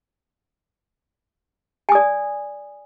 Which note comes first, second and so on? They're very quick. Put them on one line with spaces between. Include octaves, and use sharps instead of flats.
G#5 D#6 D5